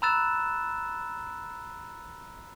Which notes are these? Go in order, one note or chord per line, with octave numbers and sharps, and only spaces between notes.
A#5 B5 E6 F#6 A6 E7